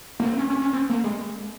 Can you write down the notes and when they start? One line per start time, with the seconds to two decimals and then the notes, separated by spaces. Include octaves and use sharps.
0.20 A#3
0.25 C4
0.37 C#4
0.50 C#4
0.62 C#4
0.73 C4
0.89 A#3
1.04 G#3